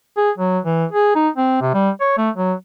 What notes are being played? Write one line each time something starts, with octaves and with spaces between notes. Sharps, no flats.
G#4
F#3
E3
G#4
D#4
C4
C3
G3
C#5
A3
F#3